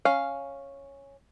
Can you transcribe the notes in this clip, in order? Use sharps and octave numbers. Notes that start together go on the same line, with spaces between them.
C#4 F5